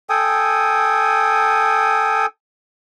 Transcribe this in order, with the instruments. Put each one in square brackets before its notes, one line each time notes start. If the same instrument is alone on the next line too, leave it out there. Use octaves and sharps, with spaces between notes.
[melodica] A4 G5 G#5 D#6